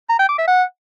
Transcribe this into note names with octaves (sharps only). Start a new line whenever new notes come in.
A#5
G5
D6
E5
F#5